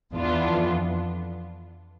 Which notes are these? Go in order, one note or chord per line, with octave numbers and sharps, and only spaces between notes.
E2 E3 B3 D4 F4
F2